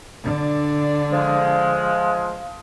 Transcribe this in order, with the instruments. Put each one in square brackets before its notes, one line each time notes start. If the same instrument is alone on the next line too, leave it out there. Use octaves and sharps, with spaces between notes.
[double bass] D3 D4
[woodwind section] F3 G#3